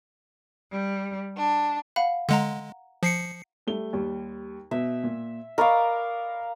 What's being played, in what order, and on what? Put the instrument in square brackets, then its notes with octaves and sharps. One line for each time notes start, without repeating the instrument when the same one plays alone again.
[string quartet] G3
D4
[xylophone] F5 F#5 B5
[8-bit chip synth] D3 G#3 [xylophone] F#5 A#5
[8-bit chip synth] F3 C7 C#7
[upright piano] G3 A3 G7
D#2 G3
[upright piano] B2 [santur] E5
[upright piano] A#2
[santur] A#4 D5 F5 [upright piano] D#5 B5 C#6